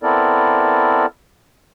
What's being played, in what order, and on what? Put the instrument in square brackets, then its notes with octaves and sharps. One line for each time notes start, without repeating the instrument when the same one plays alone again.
[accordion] B3 C4 E4 A4 A#4 D5